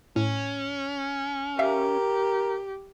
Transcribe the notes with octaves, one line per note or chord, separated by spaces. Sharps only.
A2 C#4
G4 A#4 E5 F5